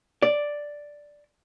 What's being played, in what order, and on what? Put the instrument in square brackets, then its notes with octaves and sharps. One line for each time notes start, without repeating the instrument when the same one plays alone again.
[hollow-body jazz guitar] D5